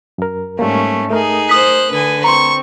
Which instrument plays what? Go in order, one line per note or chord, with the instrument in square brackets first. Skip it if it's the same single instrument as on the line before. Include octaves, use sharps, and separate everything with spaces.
[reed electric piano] F#2 A#4
[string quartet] G#2 A3 C#4 [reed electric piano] G3 A#3
[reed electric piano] A3 A#4 [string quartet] D#4 G#4
[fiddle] C5 F#6 [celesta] D#6 B6
[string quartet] D3 [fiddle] B4 G#5
[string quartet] C4 [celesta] A#5 C6 [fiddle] C#6